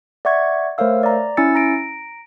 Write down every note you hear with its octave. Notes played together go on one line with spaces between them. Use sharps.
D5 E5 F#5 C#6 G#6
A3 A#4 C5 C#5 F5 E6
D5 A#5
C#4 E4 G#5 E6 A6 C#7
A#5 A#6 D7